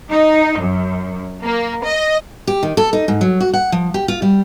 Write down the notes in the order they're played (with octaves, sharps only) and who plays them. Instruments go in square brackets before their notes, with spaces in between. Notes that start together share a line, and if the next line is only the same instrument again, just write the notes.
[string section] D#4
F#2
A#3
D#5
[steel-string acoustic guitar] G4
D#3
A4
D#4
G#2
F#3
F#4
F#5
F3
G4
F4
G3